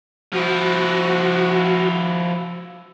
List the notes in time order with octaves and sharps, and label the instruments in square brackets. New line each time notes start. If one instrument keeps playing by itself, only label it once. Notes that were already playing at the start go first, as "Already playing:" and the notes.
[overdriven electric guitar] F3 E4 [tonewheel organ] F#4